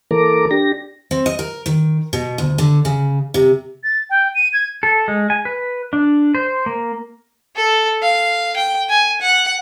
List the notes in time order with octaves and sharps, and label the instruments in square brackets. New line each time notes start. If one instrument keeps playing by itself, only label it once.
[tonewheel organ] E3 A#3 A4 A#4 A#5 D6
D4 G4 A#6
[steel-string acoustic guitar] C4
D#5
A#4
D#3
B2
D2
D3
C#3
C3
[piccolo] A6
G5
D#7
G#6
[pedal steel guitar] A4
G#3
G#5
B4
D4
C5
A#3
[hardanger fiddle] A4
F5
G5
G#5
F#5